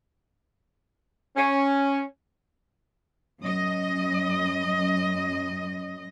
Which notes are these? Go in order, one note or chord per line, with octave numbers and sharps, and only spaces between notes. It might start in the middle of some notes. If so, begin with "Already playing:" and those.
C#4
F#2 D#5